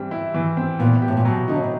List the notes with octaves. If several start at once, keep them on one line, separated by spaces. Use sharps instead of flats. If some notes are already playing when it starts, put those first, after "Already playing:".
Already playing: E3 G3 C4
E4
E3
C4
A#2 B3
G4
A2
A#2
B2 F#3
D3 D#4
C#3
C3